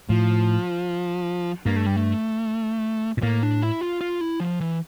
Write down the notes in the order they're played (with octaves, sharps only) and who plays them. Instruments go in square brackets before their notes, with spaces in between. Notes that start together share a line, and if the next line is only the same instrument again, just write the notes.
[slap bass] A2 [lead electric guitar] F3
[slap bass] G2 [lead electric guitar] A#3
[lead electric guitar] A3
G3
A3
[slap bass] A#2
[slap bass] A2 [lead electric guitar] A#3
[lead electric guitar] D4
E4
F4
F4
E4
F3
E3